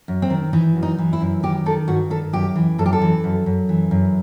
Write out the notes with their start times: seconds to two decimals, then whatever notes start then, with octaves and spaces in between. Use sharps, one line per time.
0.08 F#2
0.22 C4
0.30 D#3
0.53 E3 D#4
0.76 F#2
0.83 D#4
0.98 E3
1.13 E4
1.21 F#2
1.43 D#3 G4
1.66 D#3 A4
1.88 G2 F#4
2.10 D#3 A4
2.33 F#2 G4
2.56 E3
2.78 F#2 A4
2.86 G4
2.93 A4
3.02 E3
3.24 F#2
3.46 F#2
3.69 E3
3.91 F#2